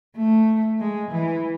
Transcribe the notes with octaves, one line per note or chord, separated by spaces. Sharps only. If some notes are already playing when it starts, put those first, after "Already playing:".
A3
G#3
E3